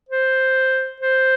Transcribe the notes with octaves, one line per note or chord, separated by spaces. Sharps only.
C5
C5